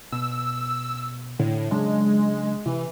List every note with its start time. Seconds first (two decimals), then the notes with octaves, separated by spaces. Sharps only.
0.12 B2 E6
1.39 A2 D3
1.71 C#3 F#3 G#3 D4
2.66 C3 E3